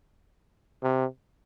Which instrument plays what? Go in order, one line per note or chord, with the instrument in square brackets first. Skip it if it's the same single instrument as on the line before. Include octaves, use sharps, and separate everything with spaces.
[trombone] C3